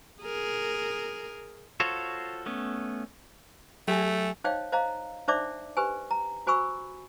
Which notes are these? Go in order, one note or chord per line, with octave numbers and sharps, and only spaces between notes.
G#4 A#4
F4 F#4 A4 C5 C#5
A3 B3 C#4
F#3 A3 G4 G#5
D#4 C5 C#5 D#5 F5 G5
C5 D#5 F5 A#5
D4 D#4 C5 D5 E5 D6
G4 B4 C5 G#5
A#5
F#4 C5 G#5 B5 C#6 E6